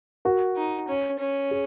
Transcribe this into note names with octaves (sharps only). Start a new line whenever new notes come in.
F#4 A#4
D#4
C#4
C#4
G#4